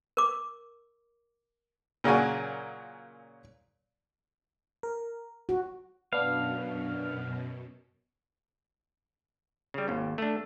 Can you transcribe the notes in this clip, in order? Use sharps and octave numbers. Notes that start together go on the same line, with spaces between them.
A#4 D6
A#2 C#3 F#3 F#4 G#5
A#4
F#4
F#2 B2 B3 D4 F5
C#3 G3
G#1 D#2
A3 D4